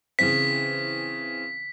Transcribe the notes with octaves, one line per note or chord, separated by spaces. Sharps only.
C#3 E3 C4 B6